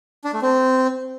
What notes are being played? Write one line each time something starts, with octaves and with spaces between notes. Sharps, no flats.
D4
A3
C4